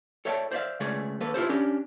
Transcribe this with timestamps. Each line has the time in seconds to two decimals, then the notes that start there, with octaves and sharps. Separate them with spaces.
0.25 A4 C#5 D5 E5 G5 A5
0.52 C5 D5 E5 F5
0.80 C#3 G#3 A3 G#4 D5
1.20 D#2 A#3 A4 B4
1.34 E4 F4 G4 A4 B4 C5
1.49 C#4 D4 G4